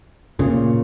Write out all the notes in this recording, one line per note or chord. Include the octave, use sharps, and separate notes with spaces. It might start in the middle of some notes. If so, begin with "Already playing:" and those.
A#2 C#3